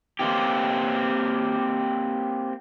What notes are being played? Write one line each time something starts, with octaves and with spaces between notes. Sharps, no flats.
A#3 C4 G4